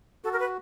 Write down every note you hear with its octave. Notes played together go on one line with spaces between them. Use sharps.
F#4 A4
A#4
B4